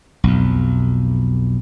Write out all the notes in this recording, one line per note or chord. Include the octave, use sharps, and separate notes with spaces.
B1 F2